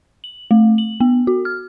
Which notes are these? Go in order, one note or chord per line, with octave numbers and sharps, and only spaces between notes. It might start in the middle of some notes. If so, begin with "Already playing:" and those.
F#7
A3
F#7
B3
F#4
F6